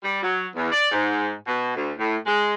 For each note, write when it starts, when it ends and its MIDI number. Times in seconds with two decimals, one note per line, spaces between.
0.03 0.19 55
0.22 0.47 54
0.55 0.70 40
0.72 0.88 74
0.91 1.32 44
1.46 1.72 47
1.75 1.92 38
1.98 2.15 45
2.26 2.54 56